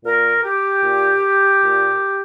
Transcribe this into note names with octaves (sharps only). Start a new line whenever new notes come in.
A#2 A#4
G4
A#2
A#2